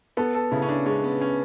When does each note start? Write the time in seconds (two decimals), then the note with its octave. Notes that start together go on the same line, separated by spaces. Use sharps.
0.17 B3 A4
0.34 A4
0.52 C#3 E4
0.62 C#4
0.69 D4
0.86 G#3 C#4
1.04 B3
1.21 C#4